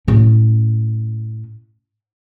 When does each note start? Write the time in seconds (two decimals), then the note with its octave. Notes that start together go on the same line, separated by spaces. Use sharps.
0.08 A2 C#4